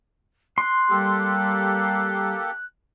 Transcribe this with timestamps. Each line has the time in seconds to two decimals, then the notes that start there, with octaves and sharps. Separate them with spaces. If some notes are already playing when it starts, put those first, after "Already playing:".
0.58 C6 F#6
0.90 G3 A#3 G4 A4